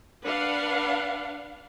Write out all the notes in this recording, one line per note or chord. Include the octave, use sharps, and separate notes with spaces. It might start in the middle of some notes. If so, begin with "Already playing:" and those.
D4 B4 F5 F#5